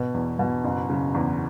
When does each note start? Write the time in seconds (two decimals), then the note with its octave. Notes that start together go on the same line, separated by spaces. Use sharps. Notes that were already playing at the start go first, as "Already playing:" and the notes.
Already playing: B2
0.14 E2
0.39 B2
0.64 F#1
0.90 C#3
1.14 E2